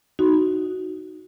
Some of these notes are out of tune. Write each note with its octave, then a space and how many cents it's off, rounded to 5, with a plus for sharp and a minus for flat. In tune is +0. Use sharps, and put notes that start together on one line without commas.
D#4 +0 F#4 +0